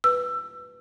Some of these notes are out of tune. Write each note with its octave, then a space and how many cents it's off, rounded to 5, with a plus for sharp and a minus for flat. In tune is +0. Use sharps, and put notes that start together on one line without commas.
B4 +0 E6 +20